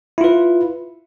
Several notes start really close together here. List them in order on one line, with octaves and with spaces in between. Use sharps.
E4 F4 B4